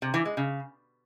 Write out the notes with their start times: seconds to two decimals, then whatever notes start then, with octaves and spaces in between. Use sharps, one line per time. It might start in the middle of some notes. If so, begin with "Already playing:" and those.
0.02 C3
0.14 E3
0.25 G#3
0.37 C#3